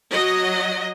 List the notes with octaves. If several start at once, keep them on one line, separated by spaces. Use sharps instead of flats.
F#3 D#5